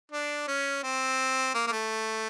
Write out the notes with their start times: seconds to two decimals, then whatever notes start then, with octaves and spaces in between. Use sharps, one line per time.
0.12 D4
0.48 C#4
0.84 C4
1.54 A#3
1.67 A#3
1.72 A3